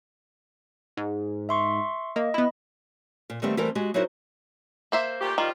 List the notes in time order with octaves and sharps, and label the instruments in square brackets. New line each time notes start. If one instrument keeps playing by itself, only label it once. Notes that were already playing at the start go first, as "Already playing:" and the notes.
[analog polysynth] G#2
[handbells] E5 C6 C#6
[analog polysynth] A#3 [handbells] D#5
[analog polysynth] B3 E4 [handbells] D#5 B5
[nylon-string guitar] A#2
D#3 G3 A3 B3 C4 G4
E3 G3 A3 C4 A#4 C5
G#3 F#4 G4
F#3 D#4 E4 F#4 A#4 C5
[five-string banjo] A#3 C5 E5
[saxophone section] A#2 A3 G4
[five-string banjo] D#3 [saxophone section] F3 G3 F4